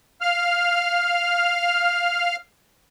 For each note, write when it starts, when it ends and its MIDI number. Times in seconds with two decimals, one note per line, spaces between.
0.21 2.36 77
0.21 2.36 89